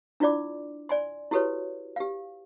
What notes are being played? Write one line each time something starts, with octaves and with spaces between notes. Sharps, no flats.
D4 E4 F4 D5 D6
D5 G#5 C6
E4 F#4 G4 A4 B4 C#5
G4 F5